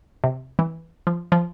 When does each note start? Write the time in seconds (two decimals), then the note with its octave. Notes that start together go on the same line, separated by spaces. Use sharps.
0.24 C3
0.59 E3
1.07 F3
1.32 F3